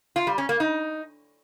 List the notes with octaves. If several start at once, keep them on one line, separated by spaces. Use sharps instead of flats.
F4
G3
C#4
A#3
D#4